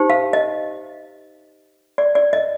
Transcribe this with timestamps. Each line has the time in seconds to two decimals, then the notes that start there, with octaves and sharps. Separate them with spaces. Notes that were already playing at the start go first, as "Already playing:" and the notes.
Already playing: D#4 G4 C5
0.10 F5
0.33 D#5
1.98 D5
2.15 D5
2.33 D#5